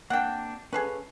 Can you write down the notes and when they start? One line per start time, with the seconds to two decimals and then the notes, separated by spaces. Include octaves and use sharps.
0.10 A#3 C4 D4 F#5 G5
0.73 C#4 G#4 A4 B4 F5